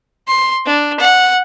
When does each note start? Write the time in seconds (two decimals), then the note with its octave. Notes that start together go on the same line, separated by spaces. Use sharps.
0.28 C6
0.66 D4
1.00 F#5